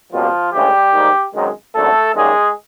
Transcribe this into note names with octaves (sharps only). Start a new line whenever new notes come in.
C#2 B2 F3 G3 A#3 F4
D2 C#3 E3 G3 G#3 G4
G#2 D#3 G3 A#3
G#1 F#2 D#3 G#3
G#1 F#2 D3 F#3 A3 A4
F#2 D#3 G3 G#3 A#3 G#4